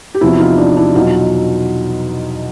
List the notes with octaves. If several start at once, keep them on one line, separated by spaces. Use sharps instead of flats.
G4
E2 C3 F3 E4 F#4
D#4 F4
D4 E4
D4 E4
E2 B2 F#3 D#4 F4